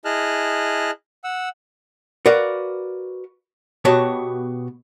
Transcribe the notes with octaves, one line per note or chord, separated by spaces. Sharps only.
E4 G#4 D#5 A5 F6 F#6
F#5 E6
F#4 A#4 B4 D5 F5
B2 B3 F#4 G4 C#5 A5